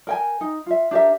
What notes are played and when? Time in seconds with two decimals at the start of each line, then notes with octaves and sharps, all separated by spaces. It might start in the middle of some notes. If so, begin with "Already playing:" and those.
0.07 A#4 G5 G#5
0.41 D#4
0.66 F4 E5
0.91 D4 G4 A#4 E5